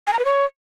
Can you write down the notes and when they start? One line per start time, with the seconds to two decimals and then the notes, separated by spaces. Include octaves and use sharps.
0.07 G#5
0.13 A#5
0.19 B4
0.25 C#5